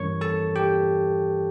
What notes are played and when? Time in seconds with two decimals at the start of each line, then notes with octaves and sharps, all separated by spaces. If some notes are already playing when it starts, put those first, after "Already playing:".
Already playing: G2 E3 G3 C#4 A#4 C#5 C#6
0.21 A4 A5
0.56 G4 G5